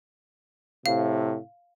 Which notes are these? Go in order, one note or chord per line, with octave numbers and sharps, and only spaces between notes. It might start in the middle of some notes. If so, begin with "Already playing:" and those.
A2 C3 F5